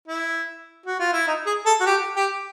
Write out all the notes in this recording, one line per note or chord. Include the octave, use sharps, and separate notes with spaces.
E4
F#4
F4
E4
D#4
G#4
A4
F#4
G4
G4